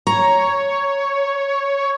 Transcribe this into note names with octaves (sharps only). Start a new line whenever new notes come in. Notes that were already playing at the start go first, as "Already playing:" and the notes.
C#5 A#5